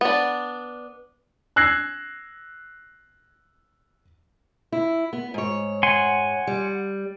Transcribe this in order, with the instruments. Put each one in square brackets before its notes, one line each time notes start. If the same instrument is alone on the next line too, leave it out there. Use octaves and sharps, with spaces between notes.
[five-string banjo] B3 D4
[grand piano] E6 F#6 G#6 A#6 C7
[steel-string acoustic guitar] E4
B3
G#2 C#5
[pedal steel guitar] F#5 G#5 C6
[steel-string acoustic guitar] G3